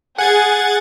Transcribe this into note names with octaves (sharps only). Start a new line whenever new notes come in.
G#4 F#5 G#6 A6